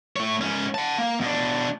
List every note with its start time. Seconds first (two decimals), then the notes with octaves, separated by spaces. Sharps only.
0.16 A3 C#5
0.41 G#2 C#4
0.74 F#5 A5
0.98 A#3
1.21 B2 D4